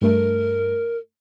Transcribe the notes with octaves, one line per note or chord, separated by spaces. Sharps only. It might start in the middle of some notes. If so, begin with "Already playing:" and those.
G2 A3 A#4